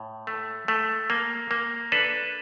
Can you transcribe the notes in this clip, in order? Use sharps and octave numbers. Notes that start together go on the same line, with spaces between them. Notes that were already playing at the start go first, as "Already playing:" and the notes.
Already playing: A2
A3
A3
A#3
A#3
D4 A4 B4